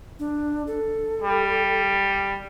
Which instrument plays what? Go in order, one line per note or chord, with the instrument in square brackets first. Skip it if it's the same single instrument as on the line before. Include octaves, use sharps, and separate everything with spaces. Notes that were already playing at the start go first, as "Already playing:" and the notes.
[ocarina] D4
A4
[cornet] G3